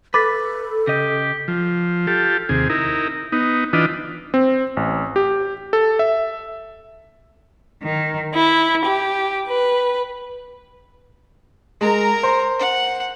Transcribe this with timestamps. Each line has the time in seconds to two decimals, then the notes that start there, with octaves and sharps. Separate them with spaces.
0.14 A4 B4 D6 A6 B6
0.87 C#3 G4 D#5
1.48 F3
2.07 F4 G4 A4
2.49 D#2 C3 G#4
2.70 D#4 E4 A#4
3.32 B3 D#4
3.73 E3 D4 F4 B4 D#5
4.34 C4
4.77 A1
5.16 G4
5.73 A4
5.99 E5
7.83 D#3
8.35 E4
8.85 G4
9.47 B4
11.81 G#3 A#4 A#5
12.23 C5
12.59 F#5